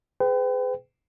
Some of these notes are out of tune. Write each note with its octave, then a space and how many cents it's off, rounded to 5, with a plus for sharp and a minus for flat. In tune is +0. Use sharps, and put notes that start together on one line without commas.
G#4 +10 B4 +40 G5 +0